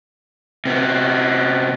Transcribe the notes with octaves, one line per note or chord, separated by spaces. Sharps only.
C3 B3